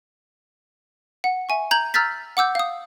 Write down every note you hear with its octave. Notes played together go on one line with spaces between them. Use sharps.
F#5
E5 G#5 C#6
A#5 G6 G#6 F#7
A#5 E6 F6 G6 A6 B6
F#5 D6 E6 G6
F5 D#6